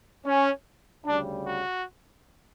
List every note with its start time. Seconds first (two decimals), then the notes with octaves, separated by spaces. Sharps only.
0.26 C#4
1.05 D2 C#3 G3 D4
1.46 F#4